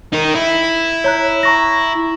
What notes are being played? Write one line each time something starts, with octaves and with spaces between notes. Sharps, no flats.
D#4 A#4
E4
C#5 A#5 F#6
A#5 C#6 A#6